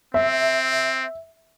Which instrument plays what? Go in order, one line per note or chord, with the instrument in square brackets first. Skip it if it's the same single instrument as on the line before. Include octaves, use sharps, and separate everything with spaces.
[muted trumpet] C4 [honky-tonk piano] E5